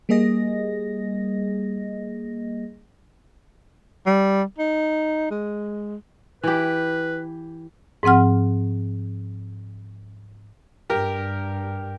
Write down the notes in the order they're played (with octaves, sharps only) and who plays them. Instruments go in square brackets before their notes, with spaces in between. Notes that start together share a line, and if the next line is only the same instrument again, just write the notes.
[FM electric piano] G3 A#3 G#4 D#5 A#6
[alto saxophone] G3
D#4
G#3
[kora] E3 G4 [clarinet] B4
[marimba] G#2 F3 C4 F#5 F6
[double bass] G2 [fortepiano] G4 A#4